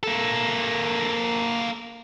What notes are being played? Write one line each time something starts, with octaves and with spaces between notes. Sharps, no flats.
A#3 A4